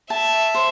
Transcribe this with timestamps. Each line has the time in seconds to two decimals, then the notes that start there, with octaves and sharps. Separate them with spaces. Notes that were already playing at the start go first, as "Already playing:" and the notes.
0.10 E5 A5
0.55 C5